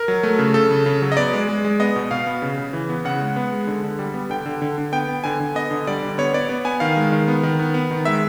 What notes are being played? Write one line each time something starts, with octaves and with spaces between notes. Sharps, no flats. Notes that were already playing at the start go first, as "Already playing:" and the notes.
Already playing: A#4
F#3
A3
C#3
C#3 A4
C#3
C#3
F#3
D#5
B3 D5
G#3
G#3
G#3
B3 D#5
B2
B2 F5
B3
C#3
C#3
E3
B3
C#3 F#5
G#3
B3
G#3
D3
D3
G3
B3
D3 G5
D3
D3
D3
B3 G5
B3
D3 G#5
D3
B3 D#5
D3
G3 D5
D3
B3 C#5
B3 D5
B3
B3 G#5
D#3 F5
G#3
D#3
B3
D#3
B3
B3
D#3
G#3 E5